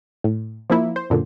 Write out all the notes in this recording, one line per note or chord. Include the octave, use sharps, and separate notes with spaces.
A2
F3 A#3 E4
C5
F#2 A#2 D3